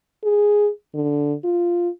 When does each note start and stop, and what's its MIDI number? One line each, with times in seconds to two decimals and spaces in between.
0.24 0.69 68
0.95 1.34 50
1.44 1.89 65